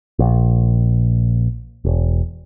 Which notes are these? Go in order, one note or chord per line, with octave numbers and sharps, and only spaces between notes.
A#1
E1